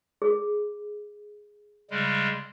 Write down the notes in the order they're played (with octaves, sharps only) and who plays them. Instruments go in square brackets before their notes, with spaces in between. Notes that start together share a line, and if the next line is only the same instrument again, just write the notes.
[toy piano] G#4
[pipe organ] C#3 G3 G#3